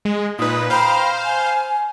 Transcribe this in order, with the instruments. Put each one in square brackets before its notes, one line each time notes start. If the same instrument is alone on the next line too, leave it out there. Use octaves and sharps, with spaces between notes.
[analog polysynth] G#3
[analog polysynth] A#2 B4 [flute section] D#4 D#6
[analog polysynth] C5 F5 [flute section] G5 A#5 B5
[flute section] G#5